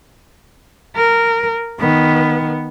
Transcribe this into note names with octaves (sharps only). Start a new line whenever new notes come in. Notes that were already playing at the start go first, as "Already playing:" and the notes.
A#4
D#3 B3